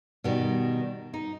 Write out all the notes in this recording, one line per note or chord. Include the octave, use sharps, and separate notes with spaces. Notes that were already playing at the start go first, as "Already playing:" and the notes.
B2 D#3 G3
D#4